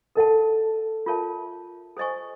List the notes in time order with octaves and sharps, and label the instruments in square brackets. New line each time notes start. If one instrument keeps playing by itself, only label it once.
[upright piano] A4 [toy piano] A#4 D#5 F#5 A5
[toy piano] F4 A#4 C#5 E5 A5
A4 C5 D#5 G#5 C#6